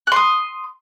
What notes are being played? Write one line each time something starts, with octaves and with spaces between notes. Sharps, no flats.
C6 D#6 F#6